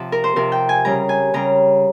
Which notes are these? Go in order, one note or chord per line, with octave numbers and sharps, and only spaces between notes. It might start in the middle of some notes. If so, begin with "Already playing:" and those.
Already playing: C3 F3
A#4
C5
C3 F3 A#4
G5
G#5
C#3 G3 A#5
G#5
C#3 G3 A#5